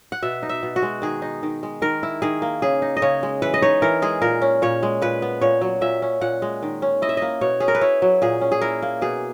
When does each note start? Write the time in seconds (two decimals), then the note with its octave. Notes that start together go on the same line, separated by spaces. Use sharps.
0.12 F#5
0.23 B2 E5
0.43 D#4
0.49 E5
0.63 B2
0.76 F#4
0.82 G#3
1.02 D#3 G#4
1.22 D#4
1.43 D#3
1.63 G#3
1.82 D#3 A#4
2.03 E4
2.22 D#3 G#4
2.42 A#3
2.62 C#3 G#4
2.82 D#4
2.97 D#5
3.02 C#3 C#5
3.23 G#3
3.42 E3 B4
3.54 D#5
3.62 D#4 C#5
3.82 E3 A#4
4.02 G#3 G#4
4.22 A#2 A#4
4.42 C#4
4.62 A#2 C#5
4.83 G#3
5.02 A#2 B4
5.22 B3
5.41 A#2 C#5
5.61 F#3
5.81 A#2 E5
6.02 C#4
6.21 A#2 F#5
6.42 G#3
6.63 D#3
6.82 C#4
7.02 E4 D#5
7.09 E5
7.17 A#3 D#5
7.41 B2 C#5
7.60 C#4 G#4
7.68 A#4
7.75 B4
7.81 E4 C#5
8.02 F#3
8.22 A#2 G#4
8.41 C#4
8.52 G#4
8.61 E4 A#4
8.82 A#3
9.01 B2 G#4